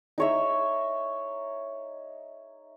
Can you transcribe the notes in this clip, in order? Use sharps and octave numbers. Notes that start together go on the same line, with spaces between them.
D#4 C#5 E5